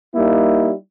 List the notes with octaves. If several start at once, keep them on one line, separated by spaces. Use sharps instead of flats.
G3 A#3 D#4 E4